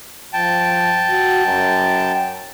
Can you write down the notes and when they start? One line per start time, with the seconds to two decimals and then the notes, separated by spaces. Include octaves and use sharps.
0.33 F3 G5 A5
1.10 F#4
1.46 F#2